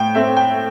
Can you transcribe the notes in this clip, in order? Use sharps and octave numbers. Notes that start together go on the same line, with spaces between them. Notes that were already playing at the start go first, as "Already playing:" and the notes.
Already playing: A2 G5
A3 C4 E5
G5